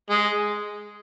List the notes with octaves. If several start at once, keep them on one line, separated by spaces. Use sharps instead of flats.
G#3